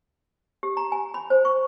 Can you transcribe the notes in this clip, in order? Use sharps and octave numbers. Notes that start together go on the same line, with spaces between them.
G4
A#5
G#5
B5
C5
C#6